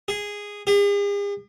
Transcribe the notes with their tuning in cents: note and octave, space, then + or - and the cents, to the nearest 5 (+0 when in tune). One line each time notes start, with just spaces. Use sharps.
G#4 -10
G#4 -45